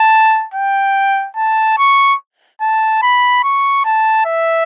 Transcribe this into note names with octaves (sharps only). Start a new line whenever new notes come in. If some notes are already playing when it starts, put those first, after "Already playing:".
Already playing: A5
G5
A5
C#6
A5
B5
C#6
A5
E5